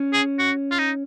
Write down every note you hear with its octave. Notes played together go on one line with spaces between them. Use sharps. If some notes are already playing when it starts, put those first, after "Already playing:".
Already playing: C#4
G#4
F#4
F4
D#4